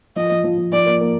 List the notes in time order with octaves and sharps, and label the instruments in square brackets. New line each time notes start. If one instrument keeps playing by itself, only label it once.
[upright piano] F3 [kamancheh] D#5
[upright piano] F3
F3
F3
[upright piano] F3 [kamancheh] D5
[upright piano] A#3
A#3